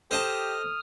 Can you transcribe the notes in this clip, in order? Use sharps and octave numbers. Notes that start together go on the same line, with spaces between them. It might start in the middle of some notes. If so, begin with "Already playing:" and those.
G4 A4 C5 D#5 A5 D#6 F6